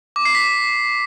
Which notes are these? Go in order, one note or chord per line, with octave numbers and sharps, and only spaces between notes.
D6
C7
B6